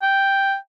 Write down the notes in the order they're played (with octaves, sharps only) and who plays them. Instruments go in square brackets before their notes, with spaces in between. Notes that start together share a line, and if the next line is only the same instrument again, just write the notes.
[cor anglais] G5